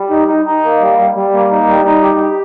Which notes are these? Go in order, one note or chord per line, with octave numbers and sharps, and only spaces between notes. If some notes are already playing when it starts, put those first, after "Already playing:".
Already playing: G3
D#4
D#4
D#4
A#3
G3
G3
G3
A#3
D#4
G3
D#4
G4
G4